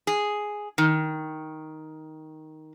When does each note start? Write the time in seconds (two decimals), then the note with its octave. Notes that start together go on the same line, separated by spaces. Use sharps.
0.07 G#4
0.78 D#3